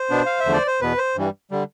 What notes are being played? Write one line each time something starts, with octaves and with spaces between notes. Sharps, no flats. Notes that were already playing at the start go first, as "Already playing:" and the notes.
Already playing: C5
B2 B3 D4
F5
E5
E2 D3 F3 A3
D5
C5
E2 B2 B3 B4
C5
G2 E3 G3
D3 G3